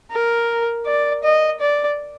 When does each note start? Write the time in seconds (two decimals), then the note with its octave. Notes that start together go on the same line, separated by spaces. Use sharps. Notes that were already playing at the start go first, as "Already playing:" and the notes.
0.12 A#4
0.86 D5
1.24 D#5
1.61 D5